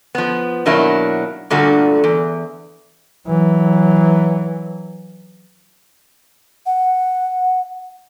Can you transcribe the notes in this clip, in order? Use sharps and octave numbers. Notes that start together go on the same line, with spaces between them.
F3 B3
B2 D#3 F#3 A#3 D4 E4
G2 A#2 D3 A3 F#4
E2
E3 F#3
F#5